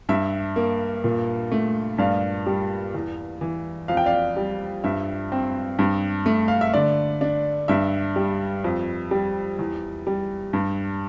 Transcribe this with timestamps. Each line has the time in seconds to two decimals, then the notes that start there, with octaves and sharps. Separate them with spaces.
0.09 G2 E5
0.56 A#3
1.04 A#2
1.52 A3
1.98 G2 D5 F5
2.46 G3
2.94 E2
3.41 E3
3.88 F2 F5
3.97 G5
4.06 D5 F5
4.37 G3
4.84 G2 E5
5.32 C4
5.79 G2
6.26 A3
6.48 F5
6.61 E5
6.74 D3 D5
7.21 D4
7.68 G2 E5
8.16 G3
8.64 F2
9.11 G3
9.59 E2
10.07 G3
10.53 G2